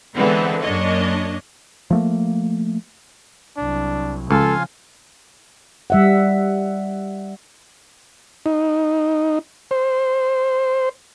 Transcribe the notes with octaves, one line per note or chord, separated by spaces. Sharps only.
D3 E3 G#3 B3 C4
F#2 A#3 D4 C#5 D#5
F3 A3 A#3
C2 F#3 D4
C#2 C#3 F3 F4 A4 F5 G#5
G3 E5 F#5
D#4
C5